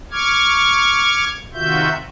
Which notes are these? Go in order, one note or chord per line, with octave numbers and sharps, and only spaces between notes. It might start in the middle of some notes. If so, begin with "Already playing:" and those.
C#6 D6 F6 G#6
C3 D#3 F4 F#4 E5 G6